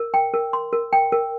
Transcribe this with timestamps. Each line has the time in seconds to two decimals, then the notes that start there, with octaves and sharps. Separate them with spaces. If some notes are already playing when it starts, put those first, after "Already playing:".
Already playing: A#4
0.14 G5
0.34 A#4
0.53 C6
0.73 A#4
0.93 G5
1.12 A#4